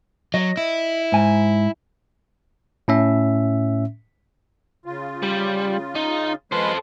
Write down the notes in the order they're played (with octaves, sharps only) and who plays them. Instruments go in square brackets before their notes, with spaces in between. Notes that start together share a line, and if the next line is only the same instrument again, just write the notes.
[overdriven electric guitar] F#3 [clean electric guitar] D#5
[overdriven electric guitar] E4
[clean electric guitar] G#2 G#5
[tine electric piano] A2 C#4 E5
[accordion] C#3 F4
[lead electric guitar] G3
D#4
[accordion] G#3 B4 C6 [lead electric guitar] A4 C5